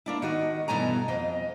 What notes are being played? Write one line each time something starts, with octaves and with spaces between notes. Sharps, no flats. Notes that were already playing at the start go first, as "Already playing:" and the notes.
A#3 D4 E4
D#3 F#4 D#5
G2 B2 E3 A3 G#5 A#5
F2 D#5